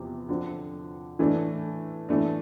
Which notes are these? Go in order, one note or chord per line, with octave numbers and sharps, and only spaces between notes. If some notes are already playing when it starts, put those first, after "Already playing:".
Already playing: E2 C3 F3
D3 F3 C4
E3 A3 D4
E3 A3 D4